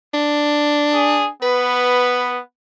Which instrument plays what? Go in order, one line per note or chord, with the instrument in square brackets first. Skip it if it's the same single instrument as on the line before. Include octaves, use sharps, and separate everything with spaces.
[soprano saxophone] D4
[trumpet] G#4
[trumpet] B3 [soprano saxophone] B4